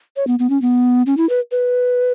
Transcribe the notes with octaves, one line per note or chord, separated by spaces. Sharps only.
C#5
B3
B3
C#4
B3
C#4
E4
B4
B4